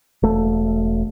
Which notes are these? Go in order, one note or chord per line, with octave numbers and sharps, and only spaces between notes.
E1 A3